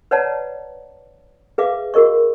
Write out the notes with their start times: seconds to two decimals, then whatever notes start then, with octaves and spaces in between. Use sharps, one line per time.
0.11 B4 C#5 D5 F#5 A5 A#5
1.58 G#4 B4 E5 F5 D6
1.94 F#4 G#4 A#4 D#5 C#6